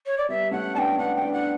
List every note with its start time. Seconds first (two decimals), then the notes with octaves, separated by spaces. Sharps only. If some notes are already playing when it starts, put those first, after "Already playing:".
0.06 C#5
0.17 D5
0.29 G3 B3 E5
0.51 A3 C#4 F#5
0.74 B3 D4 G5 A5
0.98 B3 D4 F#5
1.16 G5
1.21 B3 D4
1.33 D4 F#5